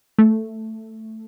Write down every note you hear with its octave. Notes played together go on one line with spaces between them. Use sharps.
A3